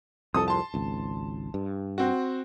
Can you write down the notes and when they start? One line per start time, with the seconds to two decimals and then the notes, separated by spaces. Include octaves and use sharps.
0.34 C2 F2 A4 D#6
0.48 A5 C6
0.74 G#1 C#2
1.54 G2
1.98 C4 F#4